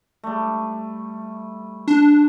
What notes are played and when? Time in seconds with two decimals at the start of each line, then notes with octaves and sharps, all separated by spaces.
0.23 G3 A3
1.88 D4